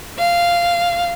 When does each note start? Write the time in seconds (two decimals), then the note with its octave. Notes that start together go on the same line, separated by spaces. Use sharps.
0.18 F5